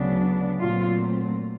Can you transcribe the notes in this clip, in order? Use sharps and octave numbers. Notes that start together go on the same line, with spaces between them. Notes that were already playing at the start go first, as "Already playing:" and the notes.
Already playing: D2 C#3 F#3 B3 D4
A#2 F#3 A3 C4 F4